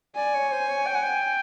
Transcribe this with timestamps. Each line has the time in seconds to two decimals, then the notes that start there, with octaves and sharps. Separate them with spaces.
0.16 D5 G#5
0.35 C#5
0.52 C5
0.69 C#5
0.87 G5
0.95 F#5
1.03 G5